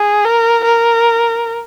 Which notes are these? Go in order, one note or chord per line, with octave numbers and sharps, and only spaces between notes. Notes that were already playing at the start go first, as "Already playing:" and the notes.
Already playing: G#4
A#4
A#4